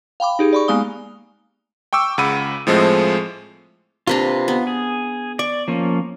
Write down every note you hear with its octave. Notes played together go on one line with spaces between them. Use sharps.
F5 G5 B5 D6
D#4 G4 G#4
D5 B5 C#6
G#3 A#3 B3 F5 D#6 G7
G5 C#6 D6 E6
C#2 C#3 F#5 B5 E6 D#7
A2 F3 G#3 A3 C4
C3 A#3 D4 F4 B4 A#5
B3
G#4
D5 C#6
F3 A#3 C#4